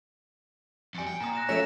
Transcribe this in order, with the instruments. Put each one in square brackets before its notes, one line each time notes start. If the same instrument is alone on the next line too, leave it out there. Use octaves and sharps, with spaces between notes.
[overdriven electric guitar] F2 G3 [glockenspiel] G#5 C#7
[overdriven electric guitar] G5
[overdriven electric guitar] A#2 [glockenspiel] A#5 D#6
[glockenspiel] F#6 A#6 E7
[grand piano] F3 A3 C#4 [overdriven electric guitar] E5 [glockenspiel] A#6 D7 E7